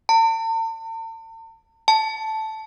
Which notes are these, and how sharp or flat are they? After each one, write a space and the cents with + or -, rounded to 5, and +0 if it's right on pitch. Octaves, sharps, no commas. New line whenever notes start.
A5 +45
A5 -5